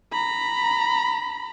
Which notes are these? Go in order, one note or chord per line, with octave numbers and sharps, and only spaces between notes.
A#5 B5